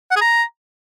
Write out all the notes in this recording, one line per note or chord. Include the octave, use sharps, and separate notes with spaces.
F#5
G#4
A#5